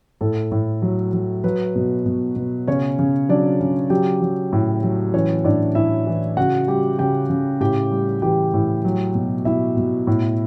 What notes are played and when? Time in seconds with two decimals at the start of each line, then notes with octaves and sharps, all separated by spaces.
0.21 A2 A4
0.52 A2
0.82 F#3
1.13 F#3
1.44 F#3 B4
1.75 B2
2.06 B2
2.36 B2
2.67 C#3 C#4 C#5
2.99 C#3
3.29 F#3 D4 D5
3.60 C#3
3.90 F#3 G4 G5
4.22 F#3
4.53 A2
4.83 F#3
5.13 E3 C#4 C#5
5.44 A2 D4 D5
5.75 A2 E4 E5
6.07 E3
6.37 C#3 F#4 F#5
6.68 G3 G4 G5
6.99 C#3 G4 G5
7.30 C#3
7.60 A2 G4 G5
7.91 G3
8.22 E3 G4 G5
8.54 A2
8.85 F#3
9.15 B2
9.45 B2 E4 E5
9.77 B2
10.07 A2